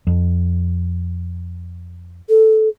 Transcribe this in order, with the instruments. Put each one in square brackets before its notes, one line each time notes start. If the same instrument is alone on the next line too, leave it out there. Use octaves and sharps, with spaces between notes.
[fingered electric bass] F2
[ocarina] A4